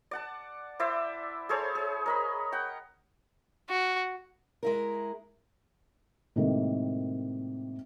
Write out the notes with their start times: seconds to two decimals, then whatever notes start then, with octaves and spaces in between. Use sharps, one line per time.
0.11 D5 F#5 A5
0.80 E4 C5 D5 E5
1.49 G#4 A4 C5 C#5
1.75 G#4
2.06 A#4 D#5 B5
2.52 F#5 G5
3.69 F#4
4.63 G#3 E4 A#4
6.36 A2 C3 D#3 G#3 A#3